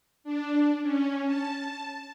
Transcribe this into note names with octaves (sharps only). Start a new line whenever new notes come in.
D4
C#4
A5